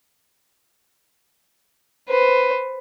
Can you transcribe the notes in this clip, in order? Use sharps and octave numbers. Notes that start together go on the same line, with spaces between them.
B4 C5